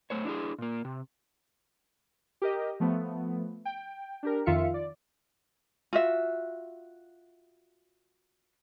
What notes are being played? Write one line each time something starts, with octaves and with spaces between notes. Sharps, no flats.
A3 C5 C#5
D4 E4 G#4
A#2 A#3
C3
G4 A#4 D#5
F3 A3 B3
G5
D4 G4 A#4
F2 D#3 F4 E5 F5 C#7
D5
F4 F#4 E5